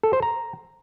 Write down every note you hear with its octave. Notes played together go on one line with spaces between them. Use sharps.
A4
C5
A#5